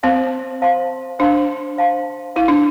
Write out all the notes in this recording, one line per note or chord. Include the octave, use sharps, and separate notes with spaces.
C4 C5 F5 A5 C6
C5 F5 A5 C6
D4 C5 F5 A5 C6
C5 F5 A5 C6
E4 B4 F5 C6
D4